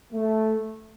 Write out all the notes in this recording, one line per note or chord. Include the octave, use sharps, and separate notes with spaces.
A3